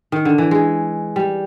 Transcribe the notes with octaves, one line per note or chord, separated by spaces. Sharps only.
D#3
D3
E3
G#3
G3